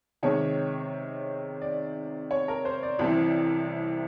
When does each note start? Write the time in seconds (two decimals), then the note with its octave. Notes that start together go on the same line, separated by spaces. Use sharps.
0.23 C3 D#3 G#3 C#5
1.61 D5
2.31 C#5
2.48 A#4
2.65 C5
2.83 D5
2.99 C2 C3 E3